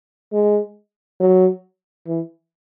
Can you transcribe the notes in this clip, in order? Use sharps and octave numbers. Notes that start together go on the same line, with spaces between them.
G#3
F#3
E3